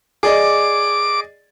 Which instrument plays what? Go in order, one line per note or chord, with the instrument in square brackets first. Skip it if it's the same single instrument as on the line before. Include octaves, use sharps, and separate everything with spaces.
[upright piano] G#4 D5 D#5 [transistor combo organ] D6